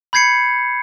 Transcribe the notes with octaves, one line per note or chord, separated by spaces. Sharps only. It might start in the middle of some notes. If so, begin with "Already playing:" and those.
B5 G6 G#6 C7 C#7